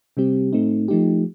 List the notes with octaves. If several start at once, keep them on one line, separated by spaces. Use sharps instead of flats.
C3 G3 C4 G4
A2 A3 C4 D#4
F3 A3 D#4 G4